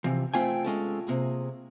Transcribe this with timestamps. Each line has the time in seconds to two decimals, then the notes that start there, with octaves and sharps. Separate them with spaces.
0.04 C3 E3 F3
0.34 A3 C4 F4 G5 G#5
0.64 G#3 C#4 A4
1.07 C3 A#3 G#4